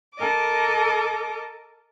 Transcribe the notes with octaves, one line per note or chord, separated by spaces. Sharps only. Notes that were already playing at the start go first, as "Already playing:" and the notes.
A4 A#4 D#5 D6